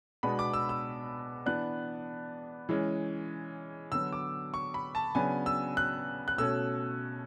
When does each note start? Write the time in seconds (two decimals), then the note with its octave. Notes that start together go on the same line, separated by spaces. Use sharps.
0.23 B2 G#3 B3 D4 B5
0.39 D6
0.54 E6
0.69 E6
1.46 E3 B3 D4 F#6
2.69 E3 G#3 C#4
3.92 D3 F#3 B3 E6
4.13 D6
4.54 C#6
4.74 B5
4.95 A5
5.15 C#3 F#3 B3 D4 G#5
5.46 E6
5.77 F#6
6.28 F#6
6.38 B2 A3 C#4 E6